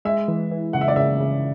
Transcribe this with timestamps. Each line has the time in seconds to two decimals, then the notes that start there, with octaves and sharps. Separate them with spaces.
0.05 G#3 E5
0.28 E3
0.51 E3
0.73 C#3 F#5
0.81 E5
0.88 D5
0.96 C#3 E5
1.20 C#3